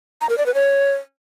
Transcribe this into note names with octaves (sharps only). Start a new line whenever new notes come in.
A#5
A#4
D5
B4
C#5